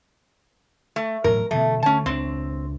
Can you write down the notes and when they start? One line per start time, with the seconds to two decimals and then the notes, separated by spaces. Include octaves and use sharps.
0.96 A3
1.24 E1 A2 F#3 A#4
1.51 B2 D3 E3 A3
1.83 D3 A3 C#4 A5
2.06 C#2 F3 C4 D4